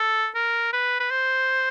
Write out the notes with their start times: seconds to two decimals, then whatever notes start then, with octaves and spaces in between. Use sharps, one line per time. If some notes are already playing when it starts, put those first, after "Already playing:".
Already playing: A4
0.35 A#4
0.73 B4
1.00 B4
1.10 C5